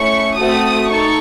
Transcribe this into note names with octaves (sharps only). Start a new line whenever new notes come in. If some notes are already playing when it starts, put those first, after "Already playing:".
Already playing: A3 C#4 E4 C#6
A3 C4 F#4 A4 D#6
D#4 A4 C#6